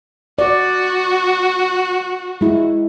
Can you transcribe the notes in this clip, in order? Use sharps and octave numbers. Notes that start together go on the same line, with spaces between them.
F#4 D5
G#3 E4